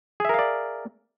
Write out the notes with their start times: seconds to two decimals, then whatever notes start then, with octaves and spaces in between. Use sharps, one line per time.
0.20 G#4
0.25 E5
0.29 A#4
0.34 F5
0.39 D5